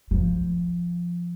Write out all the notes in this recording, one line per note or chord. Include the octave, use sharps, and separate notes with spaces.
F3